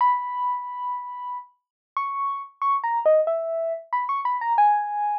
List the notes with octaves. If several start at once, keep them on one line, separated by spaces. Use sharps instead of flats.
B5
C#6
C#6
A#5
D#5
E5
B5
C#6
B5
A#5
G#5